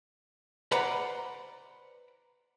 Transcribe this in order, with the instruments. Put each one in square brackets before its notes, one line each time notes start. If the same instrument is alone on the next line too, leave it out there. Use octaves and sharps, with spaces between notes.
[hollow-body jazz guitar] B4 C5 D5 F#5 A#5 B5